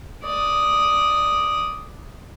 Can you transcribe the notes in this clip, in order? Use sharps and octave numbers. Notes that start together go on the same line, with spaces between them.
D5 D#6